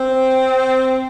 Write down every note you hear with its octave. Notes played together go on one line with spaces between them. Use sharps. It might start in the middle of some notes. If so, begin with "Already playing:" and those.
Already playing: C4